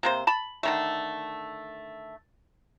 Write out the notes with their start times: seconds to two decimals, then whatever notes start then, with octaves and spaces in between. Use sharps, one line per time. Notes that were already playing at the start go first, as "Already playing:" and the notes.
0.03 C3 A#3 C5
0.27 A5 B5
0.63 D3 D#3 A3